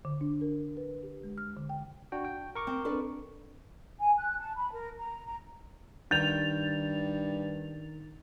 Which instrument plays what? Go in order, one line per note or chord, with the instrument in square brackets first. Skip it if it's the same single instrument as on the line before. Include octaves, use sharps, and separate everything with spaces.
[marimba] D3
D4
A#4
B4
G4
G#3
F6
D3
G5
[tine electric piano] D4 F#4 G5
G5
A#4 C#6 D6
[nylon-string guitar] C4
D4 A4 B4
[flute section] G#5
F#6
A5
B5
A#4
A#5
A#5
[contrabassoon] G2 [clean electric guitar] D#3 [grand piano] G6 [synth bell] A6 F7